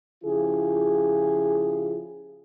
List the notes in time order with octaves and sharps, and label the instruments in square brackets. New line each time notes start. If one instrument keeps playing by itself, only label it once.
[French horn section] C#3 F3 E4 F4 G4 G#4